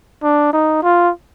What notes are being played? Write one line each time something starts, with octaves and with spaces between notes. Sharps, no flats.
D4
D#4
F4